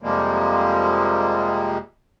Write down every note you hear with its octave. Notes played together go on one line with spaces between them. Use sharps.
F2 C3 F3 G3 G#3 A#3